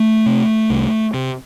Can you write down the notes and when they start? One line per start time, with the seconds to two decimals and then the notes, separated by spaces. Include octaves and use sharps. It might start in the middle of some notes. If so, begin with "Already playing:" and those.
Already playing: A3
0.26 C3
0.70 C2
1.14 C3